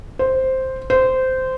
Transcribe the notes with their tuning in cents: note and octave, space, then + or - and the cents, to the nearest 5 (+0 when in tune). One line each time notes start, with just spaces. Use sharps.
C5 +0
C5 -15